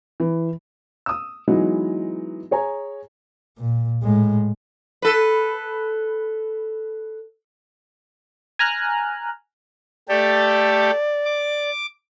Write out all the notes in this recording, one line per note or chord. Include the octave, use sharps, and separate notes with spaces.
E3
D#6 E6
E3 F#3 G#3 B3 D#4
G#4 C#5 G#5 A#5
A#2
A2 G#3
A4 B4
G#5 A#5 F6 F#6
A3 G4 A4 D5
D6